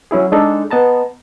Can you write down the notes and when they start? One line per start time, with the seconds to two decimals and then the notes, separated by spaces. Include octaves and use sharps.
0.11 F#3 C#4 E4 G#4
0.32 G#3 D4 D#4 A4
0.71 B3 D#5 A5 A#5